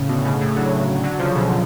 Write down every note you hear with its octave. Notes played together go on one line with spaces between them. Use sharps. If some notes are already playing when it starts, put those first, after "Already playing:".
Already playing: A2 C#3
B2 D3
A2 C#3
A2 C#3
D3 F#3
D3 F#3
C#3 F3
B2 D3